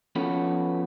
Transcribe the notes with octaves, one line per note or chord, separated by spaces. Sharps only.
F3 B3 C#4 F#4 A4 B4